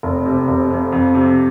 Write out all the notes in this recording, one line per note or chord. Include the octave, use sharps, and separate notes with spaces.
F1
C3
F1
F2
F2
C3